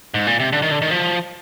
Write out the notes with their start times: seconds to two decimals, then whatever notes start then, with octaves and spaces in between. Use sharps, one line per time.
0.14 G#2
0.27 A#2
0.40 C3
0.53 D3
0.62 D#3
0.71 D3
0.82 D#3
0.91 F3